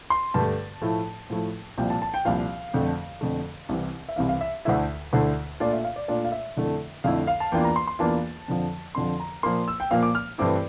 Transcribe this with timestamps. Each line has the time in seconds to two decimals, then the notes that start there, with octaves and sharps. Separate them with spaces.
0.10 C6
0.34 G2 D3 A3 A5
0.82 A2 F3 A3 E4
1.30 A2 F3 A3 E4
1.78 C2 A#2 F3 G5
1.90 A5
2.02 A5
2.14 G5
2.25 C2 A#2 F3 F5
2.74 F2 D3 A3
3.21 F2 D3 A3
3.69 C2 C3 E3
4.09 E5
4.16 C2 C3 E3 F5
4.29 F5
4.41 E5
4.65 D2 D3 A3 E4 E5
5.13 D2 D3 A3 E4
5.60 A#2 A3 D4 F4 D5
5.73 E5
5.84 F5
5.96 D5
6.08 A#2 A3 D4 F4 D5
6.25 F5
6.32 E5
6.56 F2 D3 A3 E4
7.04 F2 D3 A3 E4 F5
7.27 F5
7.40 A5
7.52 E2 E3 A#3 D4 F4 G5
7.64 A#5
7.76 C6
7.87 C6
7.99 E2 E3 A#3 D4 F4 A5
8.48 F2 D3 F3
8.95 F2 D3 F3 C6
9.20 A#5
9.43 A#2 F3 A#3 C6
9.68 E6
9.80 G5
9.91 A#2 F3 A#3 F5
10.03 D6
10.15 F6
10.38 G2 E3 A3 C4 E4 D6